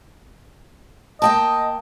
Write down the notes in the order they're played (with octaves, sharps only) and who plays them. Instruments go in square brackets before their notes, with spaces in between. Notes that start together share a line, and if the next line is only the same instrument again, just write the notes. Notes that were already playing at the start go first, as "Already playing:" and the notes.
[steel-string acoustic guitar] A#3 G5 A5 [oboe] D#5